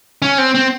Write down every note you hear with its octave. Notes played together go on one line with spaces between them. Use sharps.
C#4
C4
C4